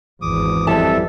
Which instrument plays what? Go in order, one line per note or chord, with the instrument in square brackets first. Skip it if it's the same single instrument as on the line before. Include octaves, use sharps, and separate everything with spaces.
[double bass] G#1 E2 [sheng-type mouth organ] D6 D#6
[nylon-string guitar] F2 A5 [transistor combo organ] E3 G3 [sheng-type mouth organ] A4 E5